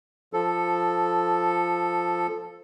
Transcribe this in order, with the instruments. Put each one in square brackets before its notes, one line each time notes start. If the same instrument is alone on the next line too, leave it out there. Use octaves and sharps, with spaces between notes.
[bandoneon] F3 A4